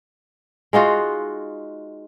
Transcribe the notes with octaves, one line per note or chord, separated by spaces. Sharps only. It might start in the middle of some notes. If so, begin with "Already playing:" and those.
G#3 D#4 F4 F#4